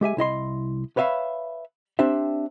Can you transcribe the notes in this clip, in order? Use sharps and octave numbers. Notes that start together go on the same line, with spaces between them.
G#3 G4 E5 G#5
C2 E4 D#5 C6
B4 C#5 E5 F5 B5
C4 D4 G4 C5 E5